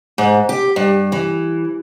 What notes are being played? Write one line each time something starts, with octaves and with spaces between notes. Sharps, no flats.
G#2
G4
G2
E3